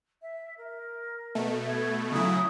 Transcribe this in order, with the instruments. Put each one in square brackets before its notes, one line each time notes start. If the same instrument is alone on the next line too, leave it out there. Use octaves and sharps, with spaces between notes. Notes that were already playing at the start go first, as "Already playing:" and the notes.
[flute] E5
A#4
[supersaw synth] B2 A3
[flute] G#6
[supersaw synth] C#3 F#3 E4 [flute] D#6